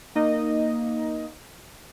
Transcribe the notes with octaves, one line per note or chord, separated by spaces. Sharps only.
A#3 D#4 D#5